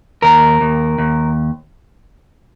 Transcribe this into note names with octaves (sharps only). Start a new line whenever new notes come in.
D#2 A#4
D#2
D#2